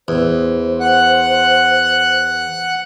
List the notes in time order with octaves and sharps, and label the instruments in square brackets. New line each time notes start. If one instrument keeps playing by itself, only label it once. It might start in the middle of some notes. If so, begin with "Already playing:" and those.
[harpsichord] E2 [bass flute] C5
[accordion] F#5 F#6